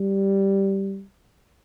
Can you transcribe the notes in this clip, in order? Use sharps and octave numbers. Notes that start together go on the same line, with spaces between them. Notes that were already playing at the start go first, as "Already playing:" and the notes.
Already playing: G3